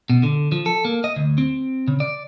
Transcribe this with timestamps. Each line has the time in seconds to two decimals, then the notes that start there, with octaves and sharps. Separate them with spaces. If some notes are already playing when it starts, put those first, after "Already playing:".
0.10 B2
0.23 D3
0.52 F3
0.66 A4
0.85 A#3
1.04 D#5
1.16 D2
1.38 C4
1.88 C#3
2.00 D5